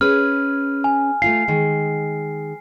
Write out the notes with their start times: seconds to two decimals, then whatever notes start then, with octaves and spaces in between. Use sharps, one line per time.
0.01 C#4 G#4 B4 F6
0.84 G#5
1.22 A3 F4 F5 C7
1.48 D#3 G#3